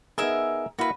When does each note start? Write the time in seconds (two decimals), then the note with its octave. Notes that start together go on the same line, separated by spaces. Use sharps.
0.18 B3 D#4 G#4 A#4 E5 G#5
0.79 A#3 E4 F#4 B4 F5